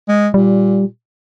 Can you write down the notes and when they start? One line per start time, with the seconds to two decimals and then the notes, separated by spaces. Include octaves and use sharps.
0.08 G#3
0.34 A#2 G3